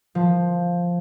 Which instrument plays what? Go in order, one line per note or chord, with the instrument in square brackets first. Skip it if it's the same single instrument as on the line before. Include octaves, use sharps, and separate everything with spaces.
[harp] F3